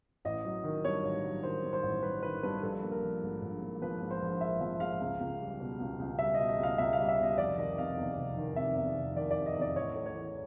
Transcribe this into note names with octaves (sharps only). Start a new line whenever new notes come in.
A1 D#5
F#3
D#3
G2 C#5
A1
F#3
D#3 C5
G2
C5
A1
F#3 B4
D#3 B4
G2 B4
A#1 A4
A#3
A#4
F3
G#2
A#1
A#3
F3 B4
G#2
C5
A#1
A#3 E5
F3 E5
G#2 F5
C#2
C#2
G3
B2
C#2
C#2
G3 E5
B2 D#5
D#5
C#2 F5
C#2 E5
F5
G3
E5
B2 D#5
F1 D5
D#3 D#5
C3 F5
E2
F1
D#3
C3 E5
E2
F1
D#3 D5
D5
C3
D#5
E2
D5
A1 C#5
A3
C#5
E3